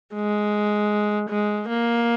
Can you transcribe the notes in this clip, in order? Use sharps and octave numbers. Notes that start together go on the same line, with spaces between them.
G#3
G#3
A#3